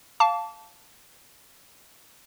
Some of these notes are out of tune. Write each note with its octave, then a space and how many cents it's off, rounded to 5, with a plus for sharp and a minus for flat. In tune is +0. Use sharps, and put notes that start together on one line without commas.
F5 +0 A5 +0 D6 -35